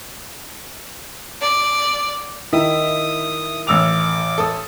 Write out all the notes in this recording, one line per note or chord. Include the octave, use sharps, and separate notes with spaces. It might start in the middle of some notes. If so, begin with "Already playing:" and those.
D5
D#3 E4 D#6
A1 D6 E6 F7
A4 D#6